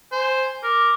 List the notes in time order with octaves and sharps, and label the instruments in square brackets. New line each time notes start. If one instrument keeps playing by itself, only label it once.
[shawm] C5 [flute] G#5
[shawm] A#4 [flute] D6